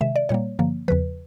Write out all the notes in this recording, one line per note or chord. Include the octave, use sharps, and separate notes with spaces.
C3 D#3 G#3 E5
D5
A#2 G3 A#3 C#5
G2 D3 F3 A#3
E2 C#3 F3 B4